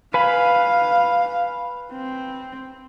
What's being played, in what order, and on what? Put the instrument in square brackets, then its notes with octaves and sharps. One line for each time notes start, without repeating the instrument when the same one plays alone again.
[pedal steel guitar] B4 G#5 B5 [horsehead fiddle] F5
[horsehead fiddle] C4